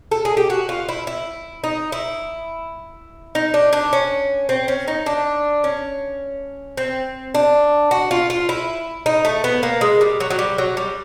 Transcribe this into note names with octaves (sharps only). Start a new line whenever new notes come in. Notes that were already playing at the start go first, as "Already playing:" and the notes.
A4
G#4
G4
F#4
F4
E4
E4
D#4
E4
D#4
D4
D4
C#4
C4
C#4
D#4
D4
C#4
C4
D4
F#4
F4
F4
E4
D#4
A3
B3
A#3
G#3
G3
F#3
F#3
G3
F#3
G3